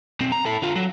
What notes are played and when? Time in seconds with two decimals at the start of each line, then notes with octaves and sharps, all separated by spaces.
0.20 B1 C4
0.32 A#5
0.45 E4 A4
0.62 D3 F4
0.76 F#3